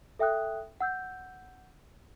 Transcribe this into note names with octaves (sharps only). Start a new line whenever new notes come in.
A4 E5 G5 D#6 F#6
F#5 E6 G6